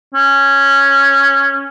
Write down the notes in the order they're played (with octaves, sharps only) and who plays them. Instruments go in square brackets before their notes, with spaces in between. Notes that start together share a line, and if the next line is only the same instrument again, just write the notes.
[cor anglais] C#4